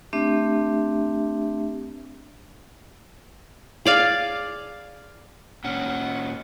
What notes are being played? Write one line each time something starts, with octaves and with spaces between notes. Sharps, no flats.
A3 C4 D4 G4 E5
G#4 D5 F5
A#2 C#4 F#5